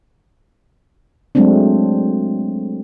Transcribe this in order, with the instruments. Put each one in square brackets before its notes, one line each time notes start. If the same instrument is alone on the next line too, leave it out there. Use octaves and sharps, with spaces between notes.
[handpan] F#3 G#3 A3 C4 D4